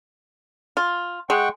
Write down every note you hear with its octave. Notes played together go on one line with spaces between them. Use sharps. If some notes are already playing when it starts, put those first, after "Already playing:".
F4
G#3 F#5 G5 C#6